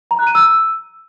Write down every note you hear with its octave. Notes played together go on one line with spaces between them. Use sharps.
A#5
F#6
D#7
E6